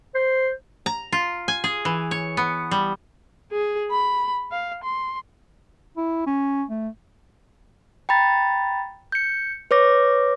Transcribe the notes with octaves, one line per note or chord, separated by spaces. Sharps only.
C5
A#5
F4
G#5
G#4
E3
C#5
B3
G3
G#4
B5
F5
C6
E4
C#4
A3
G5 A#5 B5 A6
G6 C#7
B4 C#5 D6 A#6